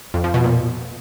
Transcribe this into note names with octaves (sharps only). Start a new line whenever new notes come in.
F2
F3
B2
A#2